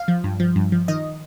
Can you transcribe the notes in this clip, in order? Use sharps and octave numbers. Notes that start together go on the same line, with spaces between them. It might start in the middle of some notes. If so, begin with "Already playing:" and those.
Already playing: F5
F3
G2
F3
G2
F3
D#3 D#5